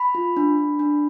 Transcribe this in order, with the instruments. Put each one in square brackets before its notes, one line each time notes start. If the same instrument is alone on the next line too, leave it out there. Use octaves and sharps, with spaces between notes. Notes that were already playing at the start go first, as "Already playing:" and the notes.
Already playing: [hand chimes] B5
F4
D4
D4
D4